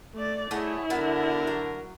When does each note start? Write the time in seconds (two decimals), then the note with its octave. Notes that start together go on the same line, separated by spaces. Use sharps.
0.14 A3 D5
0.51 A3 E4 G#4 C#5 D#5 F#5
0.90 D3 B3 F#4 A#4
1.47 F#3